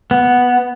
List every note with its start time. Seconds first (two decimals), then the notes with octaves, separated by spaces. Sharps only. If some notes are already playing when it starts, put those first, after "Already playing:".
0.11 B3